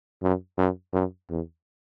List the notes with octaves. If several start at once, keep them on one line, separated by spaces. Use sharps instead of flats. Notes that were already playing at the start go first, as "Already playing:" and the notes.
F#2
F#2
F#2
E2